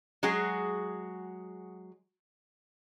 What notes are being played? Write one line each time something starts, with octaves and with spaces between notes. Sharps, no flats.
F#3 G#3 F#4 G#4